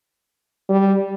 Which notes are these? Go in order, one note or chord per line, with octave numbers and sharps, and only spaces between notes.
G3